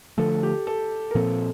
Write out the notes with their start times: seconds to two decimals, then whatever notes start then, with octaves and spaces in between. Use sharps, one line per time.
0.18 D3 F3 A3 A4
0.43 G4
0.67 A4
1.11 A#4
1.15 A#2 F3 C4 A4